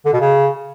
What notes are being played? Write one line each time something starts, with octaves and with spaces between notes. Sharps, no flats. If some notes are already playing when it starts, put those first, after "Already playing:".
D3
B2
C#3